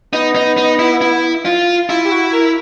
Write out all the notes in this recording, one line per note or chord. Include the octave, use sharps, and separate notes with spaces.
B3 D#4
D#4
D#4
E4
E4
F4
E4 F4
G4
F#4
A#4